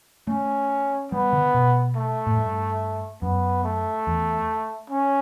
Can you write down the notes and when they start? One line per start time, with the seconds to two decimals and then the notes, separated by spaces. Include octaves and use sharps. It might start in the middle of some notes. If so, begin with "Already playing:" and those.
0.27 A3 C#4
1.12 G3 B3
1.33 D3
1.54 B2
1.96 A3
2.27 A2
2.38 G2
3.22 F#2 B3
3.64 A3
4.07 E2
4.90 C#4